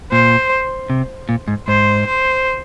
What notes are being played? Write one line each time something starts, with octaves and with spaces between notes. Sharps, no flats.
A#2 C5
C3
A#2
G#2
G#2 C5
C5